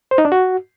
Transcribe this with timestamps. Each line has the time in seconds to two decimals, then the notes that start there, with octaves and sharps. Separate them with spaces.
0.11 C5
0.18 D#4
0.25 D4
0.32 F#4